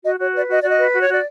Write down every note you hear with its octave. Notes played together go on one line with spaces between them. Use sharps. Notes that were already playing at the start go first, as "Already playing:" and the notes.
F#4 D#5
F#4 C#5
B4 D5
F#4 D#5
D5
F#4 D#5
B4
F#4
C#5
F#4 D5